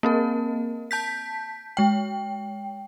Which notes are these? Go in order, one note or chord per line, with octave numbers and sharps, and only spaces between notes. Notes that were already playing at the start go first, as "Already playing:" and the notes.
A#3 C4 A#4
A5 G6 B6
G#3 G5